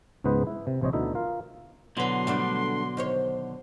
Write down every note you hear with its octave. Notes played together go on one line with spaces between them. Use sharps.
C#2 G#2 B3 B4 C5 D#5
E4
C3
A#1 C3 C5 C#5 D#5
D2 B2 D3 D#4 E4 E5
F4 A#4 F5
B2 D3 F#3 E4 B4 C6
G3 A3 D4
D#3 C5 C#5